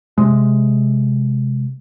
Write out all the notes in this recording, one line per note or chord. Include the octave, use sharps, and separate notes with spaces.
C3 G#3